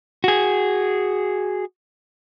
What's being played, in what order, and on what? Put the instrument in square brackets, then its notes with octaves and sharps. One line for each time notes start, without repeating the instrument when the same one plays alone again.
[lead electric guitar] F#4 G#4